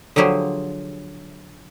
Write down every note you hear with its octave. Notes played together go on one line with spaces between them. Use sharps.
D3 F3 F#3 G4 G#4 C5